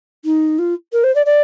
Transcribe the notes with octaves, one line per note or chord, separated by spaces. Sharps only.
D#4
F4
A#4
C5
D5
D5